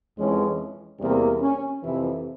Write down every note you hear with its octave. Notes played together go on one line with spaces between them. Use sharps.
F2 E3 G#3 C#4
E2 C3 G3 A#3 C4
C#4
F2 C3 E3 E4